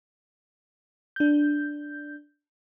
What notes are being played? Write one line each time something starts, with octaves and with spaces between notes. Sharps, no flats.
D4 G6